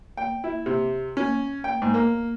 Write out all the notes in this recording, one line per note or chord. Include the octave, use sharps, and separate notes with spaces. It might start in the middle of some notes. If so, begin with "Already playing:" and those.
G5
E4
C3
C#4
G5
G#2
A#3